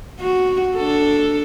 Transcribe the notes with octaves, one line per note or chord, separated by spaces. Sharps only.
F#4
D4 A4